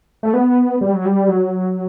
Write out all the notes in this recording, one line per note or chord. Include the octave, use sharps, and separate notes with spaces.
A3
B3
G3
F#3
G3
F#3